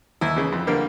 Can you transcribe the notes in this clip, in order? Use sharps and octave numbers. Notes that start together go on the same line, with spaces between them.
D#2 E4
C#3 E3
F2
D3 G3 A#3